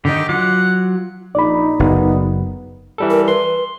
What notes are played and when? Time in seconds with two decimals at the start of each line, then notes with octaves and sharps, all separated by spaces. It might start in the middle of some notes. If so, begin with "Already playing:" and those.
0.05 D3 D#3 D#4 G4
0.29 F#3 F4 F#5 D6
1.35 A#1 D#4 D5 B5
1.79 F#1 B3
2.98 E3 G3 A4
3.10 A#4
3.28 B4 C6